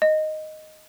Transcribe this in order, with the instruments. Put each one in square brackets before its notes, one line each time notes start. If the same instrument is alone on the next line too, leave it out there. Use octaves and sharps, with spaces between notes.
[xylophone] D#5